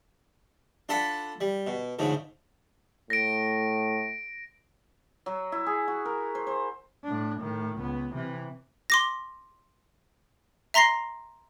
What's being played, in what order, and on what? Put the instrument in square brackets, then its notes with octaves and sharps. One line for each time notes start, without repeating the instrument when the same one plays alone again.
[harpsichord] D4 F4 A4 F#5 A5 B5
G3
B2
D2 G#2 C#3 F3
[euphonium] A2 [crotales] A#6 D7
[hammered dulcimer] F#3
E4
G#4
F#4
A#4
C5
C5
[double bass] A2 D4
A2 D#3
C#2 B3
C3 E3
[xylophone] C6 D6 A#6
E5 A#5 C6 A#6 C7